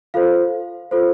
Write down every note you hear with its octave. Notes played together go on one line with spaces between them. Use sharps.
F4 A4 C5 F5
F4 A4 C5